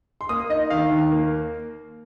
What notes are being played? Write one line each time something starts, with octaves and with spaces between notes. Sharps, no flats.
C6
A#3 D#6
D#4 D#5
D#3 F5
D#2
A#3